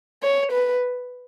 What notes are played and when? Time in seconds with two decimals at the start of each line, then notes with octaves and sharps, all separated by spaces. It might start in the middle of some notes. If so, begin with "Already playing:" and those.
0.23 C#5
0.52 B4